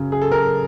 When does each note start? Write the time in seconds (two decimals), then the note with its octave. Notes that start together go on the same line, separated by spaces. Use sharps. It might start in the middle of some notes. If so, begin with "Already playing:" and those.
Already playing: F#2 C#3
0.12 G#4
0.22 A4
0.31 C#3 A#4